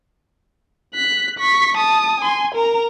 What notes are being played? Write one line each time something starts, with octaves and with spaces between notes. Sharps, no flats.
F#6 B6
C#6 B6
A5 D#6
G#5 C6
A#4 A#5